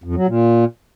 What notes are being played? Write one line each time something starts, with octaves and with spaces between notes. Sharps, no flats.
F2
F#3
A#2